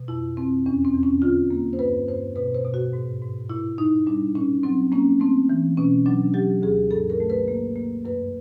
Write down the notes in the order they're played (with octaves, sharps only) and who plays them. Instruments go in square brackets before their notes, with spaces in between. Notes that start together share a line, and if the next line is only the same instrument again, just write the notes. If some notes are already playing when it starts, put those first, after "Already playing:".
Already playing: [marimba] B2
F2 E4
F2 C4
E2 C#4
C4
E2
C#4
D3 F4
A#3
C5
G2 B4
G2 C5
B2 B4
C5
B2
F#4
G#2
G#2
A#2 E4
A#2 D#4
G3 D4
A#2 C#4
F#3 C4
A#3 C#4
A3 C4
E3
B2 C#4
F#3 D4
F#3 G4
D2 G#4
G2 A4
A#4
A3
B4
A#3
A#3
F#2 B4